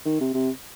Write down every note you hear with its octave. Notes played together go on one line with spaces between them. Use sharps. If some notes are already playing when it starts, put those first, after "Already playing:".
D#3
C3
C3